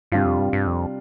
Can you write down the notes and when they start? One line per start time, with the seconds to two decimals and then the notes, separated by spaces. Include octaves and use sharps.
0.12 G2 C3 G3 D4 F4
0.25 F2
0.39 G2
0.53 G2
0.67 F2